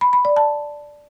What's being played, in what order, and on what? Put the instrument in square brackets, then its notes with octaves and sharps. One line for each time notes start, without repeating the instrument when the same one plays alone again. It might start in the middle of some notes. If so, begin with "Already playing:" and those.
[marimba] B5
B5
D5
A5